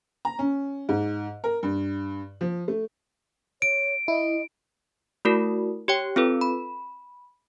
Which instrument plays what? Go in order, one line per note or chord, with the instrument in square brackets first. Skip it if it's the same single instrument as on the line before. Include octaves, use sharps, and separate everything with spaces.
[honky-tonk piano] A#5
C#4
G#2
A#4
G2
F3
A3
[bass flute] C#5 [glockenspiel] D7
[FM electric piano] E4 [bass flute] D#5
[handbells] A3 E4 F#4 A#4
G4 C#5 G5
C4 F4 A4 B4
B5